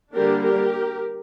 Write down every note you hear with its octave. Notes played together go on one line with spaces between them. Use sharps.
D3 G3 A#3 D4 G4 A#4
G4 A#4